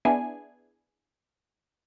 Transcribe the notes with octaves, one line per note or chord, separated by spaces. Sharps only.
B3 D4 E4 G#4 G#5